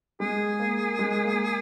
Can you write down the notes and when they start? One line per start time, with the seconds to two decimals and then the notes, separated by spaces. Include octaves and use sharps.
0.20 G#3 G#4
0.59 A#3
0.99 G#3
1.24 A#3